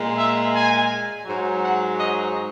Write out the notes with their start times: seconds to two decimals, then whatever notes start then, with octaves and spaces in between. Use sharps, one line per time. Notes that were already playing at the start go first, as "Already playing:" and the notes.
Already playing: A#2 G#3
0.17 E5
0.54 G#5
1.26 G#2 F#3
1.63 F#5
1.99 D#5